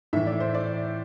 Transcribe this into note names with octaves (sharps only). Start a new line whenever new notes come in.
A2 E3 E5
D5
C5
D5